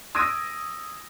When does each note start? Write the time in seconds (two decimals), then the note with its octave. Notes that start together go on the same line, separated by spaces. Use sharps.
0.15 D#6 E6 G#6 A#6 D7 D#7